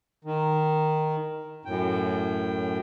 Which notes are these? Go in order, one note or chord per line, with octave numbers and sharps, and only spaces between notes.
D#3
F#2 A2 G5